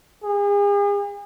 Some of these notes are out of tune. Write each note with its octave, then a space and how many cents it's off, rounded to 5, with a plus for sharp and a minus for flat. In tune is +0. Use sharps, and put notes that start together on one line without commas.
G#4 -40